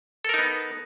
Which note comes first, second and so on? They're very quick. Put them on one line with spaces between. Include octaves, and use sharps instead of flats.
A4 A#4 D#4 B3